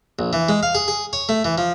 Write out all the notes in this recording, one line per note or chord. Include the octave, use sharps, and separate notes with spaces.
A#1
E3
G#3
F5
G#4
G#4
C#5
A3
E3
F3